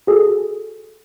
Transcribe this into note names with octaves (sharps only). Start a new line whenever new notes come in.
F#4 G#4 A4